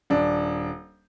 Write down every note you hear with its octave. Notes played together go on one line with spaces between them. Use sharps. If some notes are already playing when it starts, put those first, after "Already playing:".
D#1 D4